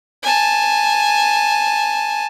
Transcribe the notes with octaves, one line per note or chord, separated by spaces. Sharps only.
G#5 A5